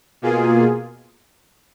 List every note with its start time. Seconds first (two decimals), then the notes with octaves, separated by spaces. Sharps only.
0.22 B2 A#3 F4 G#4